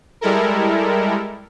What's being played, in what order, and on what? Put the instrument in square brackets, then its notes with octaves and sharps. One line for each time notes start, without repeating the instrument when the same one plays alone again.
[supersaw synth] G3 G#3 E4 A4 A#4